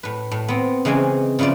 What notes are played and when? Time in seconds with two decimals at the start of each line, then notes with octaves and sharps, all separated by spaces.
0.03 A2 B4
0.31 A2
0.48 B3 C4
0.85 C#3 E3 G#3 C4 G#5
1.39 C#3 F3 E4 F4 D5